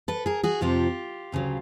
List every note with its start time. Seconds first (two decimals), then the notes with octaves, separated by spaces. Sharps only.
0.08 A4 B4
0.26 G#4 A#4
0.43 F#4 G#4
0.61 F2 C3 F3 F4 G4
1.32 D2 C#3 F#3